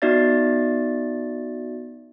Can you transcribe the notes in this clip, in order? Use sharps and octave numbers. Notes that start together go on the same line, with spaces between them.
B3 D#4 F#4 D5 E5 A6